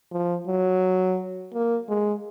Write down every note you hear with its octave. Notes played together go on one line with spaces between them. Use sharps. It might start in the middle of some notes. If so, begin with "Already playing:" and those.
F3
F#3
A#3
G#3